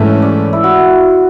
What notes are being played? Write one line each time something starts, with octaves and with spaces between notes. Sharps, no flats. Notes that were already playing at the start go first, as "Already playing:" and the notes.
Already playing: G#2 E3 A3 C#4
D5
E4
F#4